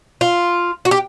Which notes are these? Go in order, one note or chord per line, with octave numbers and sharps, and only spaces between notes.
F4
F#4
G4